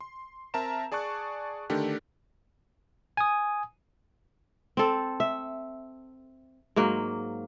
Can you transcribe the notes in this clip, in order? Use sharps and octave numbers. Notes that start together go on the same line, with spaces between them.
C6
C4 A#4 E5 A5 A#5 E7
G#4 D5 A5 C#6 F#6
D3 D#3 A3 D4 G4
G#5 D#6
C4 A4
E5
G#2 F#3 A#3